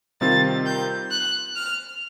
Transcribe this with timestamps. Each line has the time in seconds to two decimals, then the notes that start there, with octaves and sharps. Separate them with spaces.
0.21 C3 D#3 G3 C4 F4 A6
0.66 G6
1.11 F#6
1.56 F6